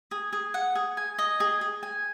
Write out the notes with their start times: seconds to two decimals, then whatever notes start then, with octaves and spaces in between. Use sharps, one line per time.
0.11 G#4
0.33 G#4
0.54 F#5
0.75 G#4
0.97 G#5
1.18 D#5
1.40 G#4
1.61 G#4
1.83 G#5